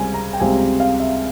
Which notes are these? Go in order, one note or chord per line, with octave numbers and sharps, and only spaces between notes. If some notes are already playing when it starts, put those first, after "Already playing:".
Already playing: C#2 C3 G3 C4 G#5
A#5
G5
C#2 C3 G3 C4 G#5
F5
E5